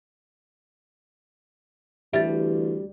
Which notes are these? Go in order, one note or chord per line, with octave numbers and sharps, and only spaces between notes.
D2 E3 G3 E5 A6